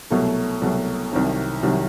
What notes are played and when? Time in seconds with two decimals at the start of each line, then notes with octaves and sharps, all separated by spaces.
0.10 C2 B2 F#3 A3
0.62 C2 B2 F#3 A3
1.11 C2 C3 D#3 F#3
1.63 C2 C3 D#3 F#3